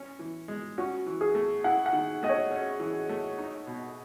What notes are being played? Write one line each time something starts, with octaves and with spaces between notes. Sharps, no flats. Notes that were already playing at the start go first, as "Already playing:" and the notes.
Already playing: C#4
E3
G#3
C#4 F#4
E3
G#4
A3
E4 F#5
F#5
D#3
A3 D#5
C#5
C#4
E3
A3
D#4
B2